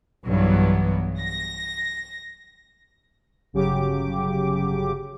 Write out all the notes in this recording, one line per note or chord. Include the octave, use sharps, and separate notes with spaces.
B1 G2 E3 F#3 B3
A#6
G1 C#3 F#3 G4 D6